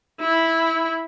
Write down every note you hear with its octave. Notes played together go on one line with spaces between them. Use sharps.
E4